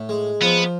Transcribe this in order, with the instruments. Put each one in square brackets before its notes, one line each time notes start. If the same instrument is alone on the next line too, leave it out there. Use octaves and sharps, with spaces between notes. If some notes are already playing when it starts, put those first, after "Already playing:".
Already playing: [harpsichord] A2
G#3
[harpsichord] F3 [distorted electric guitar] B3